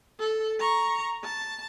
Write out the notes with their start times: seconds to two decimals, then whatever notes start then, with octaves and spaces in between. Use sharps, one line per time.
0.19 A4
0.60 A#5 C#6
1.24 A5